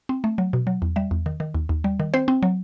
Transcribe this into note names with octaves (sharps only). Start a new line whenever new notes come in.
C4
A3
F#3
B2
F#3
E2
G3 E5
E2
D#3
D#3
D#2
D#2
G3
D#3
C4 C5
C4
F#3